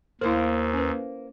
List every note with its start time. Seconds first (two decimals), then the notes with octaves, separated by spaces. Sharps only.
0.21 D#2 A#3 E4 A#4 C5
0.74 C#4 B4